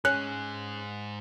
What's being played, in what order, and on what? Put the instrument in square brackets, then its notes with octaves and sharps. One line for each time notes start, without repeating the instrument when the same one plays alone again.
[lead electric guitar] G#2 G#4 [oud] C#4 [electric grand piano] F#6